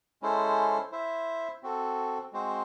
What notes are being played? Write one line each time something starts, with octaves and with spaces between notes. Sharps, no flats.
G#3 C#4 E4 A4 C5
E4 C5 E5
C4 F#4 A4
G#3 C4 F#4 C5